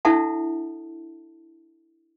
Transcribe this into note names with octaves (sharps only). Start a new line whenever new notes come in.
D4 E4 A4 E5 F#5 A5